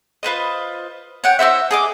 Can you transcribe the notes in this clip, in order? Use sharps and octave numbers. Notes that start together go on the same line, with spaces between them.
F4 B4 C5 D#5
C#5 F#5 G5
E4 F#4 C5 E5
G#4 D#5 D6